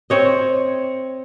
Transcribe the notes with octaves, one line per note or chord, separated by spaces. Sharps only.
C4 C#5 D#5